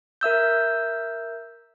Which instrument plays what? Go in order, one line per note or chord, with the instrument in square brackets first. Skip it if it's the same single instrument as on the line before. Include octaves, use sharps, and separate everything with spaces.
[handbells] A#4 E5 E6 G6